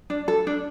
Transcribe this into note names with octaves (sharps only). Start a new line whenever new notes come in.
D4
A4
D4